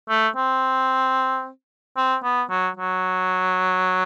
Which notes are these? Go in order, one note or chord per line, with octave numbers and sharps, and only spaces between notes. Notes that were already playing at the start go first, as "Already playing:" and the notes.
A3
C4
C4
B3
F#3
F#3